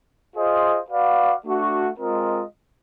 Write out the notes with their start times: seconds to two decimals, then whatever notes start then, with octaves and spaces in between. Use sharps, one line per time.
0.35 F4 G#4 C5 D#5
0.90 F#4 B4 D5 F5
1.45 A3 D4 F#4
1.99 G#3 C4 F4 A#4 D#5